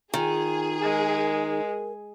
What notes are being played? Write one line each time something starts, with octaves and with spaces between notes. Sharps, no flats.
D#3 F4 G#4
G#3 A#4